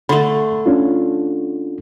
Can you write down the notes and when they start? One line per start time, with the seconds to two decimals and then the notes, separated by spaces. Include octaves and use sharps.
0.09 D3 A3 B5 C6
0.66 C#4 D4 F4